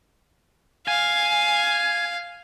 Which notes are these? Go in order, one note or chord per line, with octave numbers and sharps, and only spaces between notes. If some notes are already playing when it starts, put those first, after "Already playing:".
F5 G#5